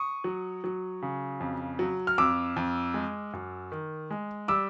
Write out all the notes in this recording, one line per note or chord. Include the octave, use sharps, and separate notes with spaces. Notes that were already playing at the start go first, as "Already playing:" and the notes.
Already playing: C#6 D#6
F#3
F#3
C#3
F2
F#3
F6
F2 D6 E6
F2
G#3
F#2
D#3
G#3
G3 D6 E6